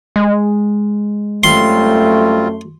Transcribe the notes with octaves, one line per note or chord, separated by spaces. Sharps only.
G#3
F#2 G3 A3 C4 F4 C6